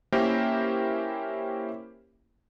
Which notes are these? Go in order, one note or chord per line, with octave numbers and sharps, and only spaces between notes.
A#3 C#4 E4 G4 A#4 C5